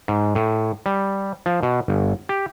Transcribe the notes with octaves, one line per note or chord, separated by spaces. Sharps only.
G#2
A2
G3
F3
B2
G1
G4